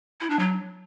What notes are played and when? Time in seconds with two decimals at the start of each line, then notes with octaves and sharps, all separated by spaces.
0.21 E4
0.30 D4
0.39 F#3